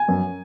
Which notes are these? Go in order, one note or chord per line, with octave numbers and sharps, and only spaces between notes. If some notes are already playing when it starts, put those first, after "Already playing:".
Already playing: G#5
F#2